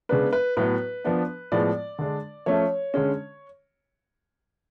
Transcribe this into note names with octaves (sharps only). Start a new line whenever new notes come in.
C#3 G#3 B3 D4 B4
B4
A2 F#3 B3 B4
F3 B3 D4
A2 F3 G#3 B3 D5
D3 G#3 D4
F3 A3 C#4 C#5
D3 G#3 C#4